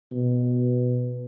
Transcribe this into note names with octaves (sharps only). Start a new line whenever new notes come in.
B2